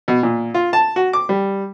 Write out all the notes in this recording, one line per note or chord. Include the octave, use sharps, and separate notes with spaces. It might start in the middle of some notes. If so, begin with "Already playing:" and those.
B2
A#2
F4
A5
F#4
D6
G3